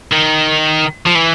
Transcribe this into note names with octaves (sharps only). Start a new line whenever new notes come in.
D#3
F3
E3